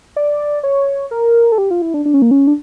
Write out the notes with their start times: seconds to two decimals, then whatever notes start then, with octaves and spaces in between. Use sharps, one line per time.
0.16 D5
0.63 C#5
1.11 A#4
1.52 A4
1.58 G4
1.71 F4
1.82 E4
1.94 D4
2.05 D4
2.14 C#4
2.22 A#3
2.31 C#4
2.47 D4